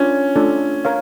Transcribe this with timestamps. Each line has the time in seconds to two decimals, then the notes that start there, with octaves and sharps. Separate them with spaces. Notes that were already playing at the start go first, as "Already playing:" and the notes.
Already playing: C#4 D4 F4 A#4
0.36 A3 D4 F4 A4
0.85 A#4 C#5 F5